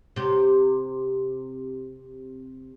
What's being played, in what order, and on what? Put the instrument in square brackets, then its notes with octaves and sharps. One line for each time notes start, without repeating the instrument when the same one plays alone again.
[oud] C3 G4